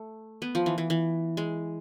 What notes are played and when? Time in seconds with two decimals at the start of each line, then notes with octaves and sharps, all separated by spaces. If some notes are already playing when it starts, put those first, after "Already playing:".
Already playing: A3
0.42 B3
0.55 F3
0.66 E3
0.78 E3
0.90 E3
1.37 G#3